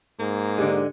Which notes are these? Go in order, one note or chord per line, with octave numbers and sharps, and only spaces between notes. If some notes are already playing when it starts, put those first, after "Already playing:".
G#2 A#3
D3 G#3 G4